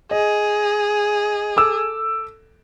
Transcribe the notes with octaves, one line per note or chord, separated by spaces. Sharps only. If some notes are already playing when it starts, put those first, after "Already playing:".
G#4 D#5
A4 D6 E6